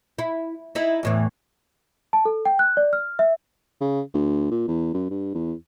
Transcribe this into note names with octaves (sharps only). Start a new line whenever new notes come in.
E4
D#4 E4 E5
E2 A2 E3
A5
A4
G5
F#6
D5
F6
E5
C#3
D2
A#2
E2
F#2
G2
E2